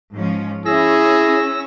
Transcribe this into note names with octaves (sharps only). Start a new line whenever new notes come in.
G#2 F3 C#4
C#4 E4 G#4 E6 A#6